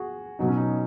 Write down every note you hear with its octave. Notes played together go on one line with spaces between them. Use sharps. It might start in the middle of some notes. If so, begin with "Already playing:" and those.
Already playing: F#4 G#4
B2 F#3 D#4
C#4
D#4